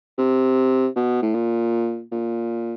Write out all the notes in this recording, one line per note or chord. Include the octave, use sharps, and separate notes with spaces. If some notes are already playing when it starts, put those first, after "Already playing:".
C3
B2
A2
A#2
A#2